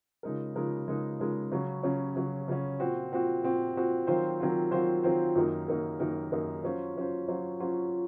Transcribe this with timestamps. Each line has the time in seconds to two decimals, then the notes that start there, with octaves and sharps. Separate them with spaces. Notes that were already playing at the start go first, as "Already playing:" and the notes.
0.23 C#3 F3 G#3 D#4 A#4
0.55 C#3 F3 G#3 D#4 A#4
0.88 C#3 F3 G#3 D#4 A#4
1.19 C#3 F3 G#3 D#4 A#4
1.52 C#3 F#3 C#4
1.83 C#3 F#3 C#4
2.16 C#3 F#3 C#4
2.48 C#3 F#3 C#4
2.79 A#2 F3 C4 F#4
3.11 A#2 F3 C4 F#4
3.43 A#2 F3 C4 F#4
3.75 A#2 F3 C4 F#4
4.07 D#3 F#3 C4 F4 C5
4.40 D#3 F#3 C4 F4 C5
4.71 D#3 F#3 C4 F4 C5
5.03 D#3 F#3 C4 F4 C5
5.35 F#2 D#3 A#3 D#4 A#4
5.68 F#2 D#3 A#3 D#4 A#4
6.00 F#2 D#3 A#3 D#4 A#4
6.32 F#2 D#3 A#3 D#4 A#4
6.64 F#3 C#4 F4 C5
6.97 F#3 C#4 F4 C5
7.28 F#3 C#4 F4 C5
7.60 F#3 C#4 F4 C5